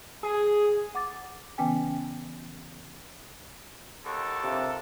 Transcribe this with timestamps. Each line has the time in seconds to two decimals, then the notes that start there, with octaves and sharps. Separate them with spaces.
0.23 G#4
0.95 F#5 D6 A6
1.58 C#3 E3 B3 C#4 G5 G#5
4.05 D#2 A4 F#5 C#6
4.43 C3 D4 F4 A#4